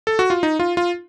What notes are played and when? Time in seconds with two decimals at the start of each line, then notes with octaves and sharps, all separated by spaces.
0.07 A4
0.19 F#4
0.30 F4
0.43 D#4
0.60 F4
0.77 F4